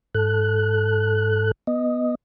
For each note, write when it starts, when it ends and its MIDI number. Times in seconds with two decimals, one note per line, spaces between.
0.15 1.51 44
0.15 1.51 69
0.15 1.51 90
1.67 2.15 59
1.67 2.15 75